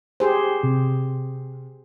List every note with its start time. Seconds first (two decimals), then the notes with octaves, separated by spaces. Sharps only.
0.20 G4 G#4 C5
0.63 C3